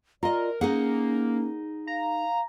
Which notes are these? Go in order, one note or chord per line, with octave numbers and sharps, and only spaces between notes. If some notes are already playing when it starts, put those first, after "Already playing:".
F4 A#4 D5 D#5
A#3 C#4 D#4 G#4 F#5
F5 A#5